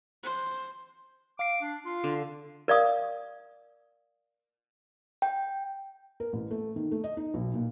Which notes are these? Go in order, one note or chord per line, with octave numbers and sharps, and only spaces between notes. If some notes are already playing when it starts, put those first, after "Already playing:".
C5
F5 D6 C7
D4
F4
D3
A#4 D5 F5 D#6
G5
A#4
A1
A3
D#3
A3
D#5
D#4
B1
A#2